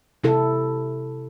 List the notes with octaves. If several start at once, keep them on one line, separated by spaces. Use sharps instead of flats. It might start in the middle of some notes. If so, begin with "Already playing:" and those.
C3 E4 A4